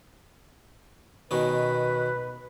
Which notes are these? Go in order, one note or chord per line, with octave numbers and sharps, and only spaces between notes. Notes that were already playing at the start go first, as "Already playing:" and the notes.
B2 D#3 C#4 B4